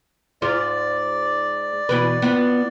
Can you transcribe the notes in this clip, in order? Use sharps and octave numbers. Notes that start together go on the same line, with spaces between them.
G#2 F4 D5
B2 E3 B4
B3 F4